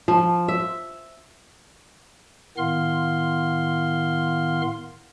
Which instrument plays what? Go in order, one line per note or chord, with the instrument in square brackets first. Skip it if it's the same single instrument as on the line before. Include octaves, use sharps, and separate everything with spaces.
[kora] F3
E5
[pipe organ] A2 D#3 B3 F5 C6 F6